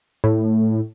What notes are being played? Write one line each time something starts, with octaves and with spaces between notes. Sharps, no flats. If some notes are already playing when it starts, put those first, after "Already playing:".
A2